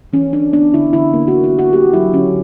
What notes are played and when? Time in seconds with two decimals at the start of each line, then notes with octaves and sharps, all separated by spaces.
0.13 E3 C#4
0.33 C#4 D4
0.53 B3 D4
0.73 D3 E4
0.93 D3 E4
1.13 A#3
1.28 F#4
1.33 D3
1.44 E4
1.53 A#3
1.59 F#4
1.73 A#3 G4
1.93 F#3 E4
2.13 D3 C#4